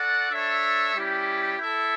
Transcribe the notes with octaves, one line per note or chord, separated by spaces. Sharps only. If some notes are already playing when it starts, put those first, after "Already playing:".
Already playing: F#4 A4 D5 F#5
D4 A4 C#5 E5
G3 C#4 E4 G4
E4 A4 E5